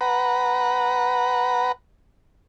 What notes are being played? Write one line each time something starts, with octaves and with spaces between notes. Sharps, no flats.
B4 F#5 A#5